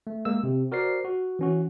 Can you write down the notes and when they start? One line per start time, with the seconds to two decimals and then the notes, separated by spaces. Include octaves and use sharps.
0.07 A3
0.25 G#3 A#3 E6
0.43 C3
0.72 F#4 A#4 C5 D5 C7
1.04 F#4
1.39 E3 C#4 F#4